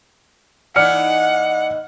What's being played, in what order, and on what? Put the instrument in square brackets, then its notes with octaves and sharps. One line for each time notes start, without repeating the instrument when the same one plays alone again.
[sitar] E3 A#3 D#4 [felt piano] D5 F6 C#7 [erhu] F#5